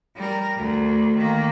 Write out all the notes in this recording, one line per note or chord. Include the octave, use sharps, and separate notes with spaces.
G3 A#4
D2
D#3 A#3